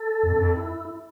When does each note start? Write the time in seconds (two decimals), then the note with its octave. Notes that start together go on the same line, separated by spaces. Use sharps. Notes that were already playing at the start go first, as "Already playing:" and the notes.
Already playing: A4
0.23 F2
0.32 G2
0.40 F2
0.56 E4